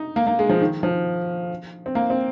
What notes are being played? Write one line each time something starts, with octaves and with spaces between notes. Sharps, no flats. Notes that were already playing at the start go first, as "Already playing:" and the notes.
Already playing: D#4
A#3
A#3
G#3
F3
D#3
F3
C4
A#3
C4